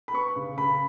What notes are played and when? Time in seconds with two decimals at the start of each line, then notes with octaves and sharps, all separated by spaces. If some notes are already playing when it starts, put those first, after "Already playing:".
0.08 B5
0.13 B3 C#6
0.36 C#3
0.58 C#3 B5